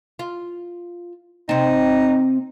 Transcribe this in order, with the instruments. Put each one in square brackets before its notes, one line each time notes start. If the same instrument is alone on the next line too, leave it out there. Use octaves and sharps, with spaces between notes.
[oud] F4
[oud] C3 C4 [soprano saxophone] D#4